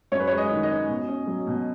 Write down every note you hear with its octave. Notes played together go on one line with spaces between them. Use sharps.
F#2 C#5
B4
G#3 C#5
D#5
D#3
D#5
C#4
B2
C#4
F#3
B2